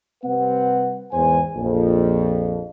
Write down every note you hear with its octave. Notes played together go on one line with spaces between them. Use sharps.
C3 G3 C4 B4 F#5
E2 G#2 C5 G#5
A#1 F2